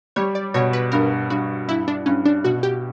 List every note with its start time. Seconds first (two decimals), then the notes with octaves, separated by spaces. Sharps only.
0.16 G3 C#5
0.35 D5
0.54 B2 C#5
0.73 B4
0.92 G2 A#4
1.30 G2 F#4
1.68 G2 E4
1.88 D4
2.06 G2 C#4
2.25 D4
2.44 B2 F#4
2.63 G4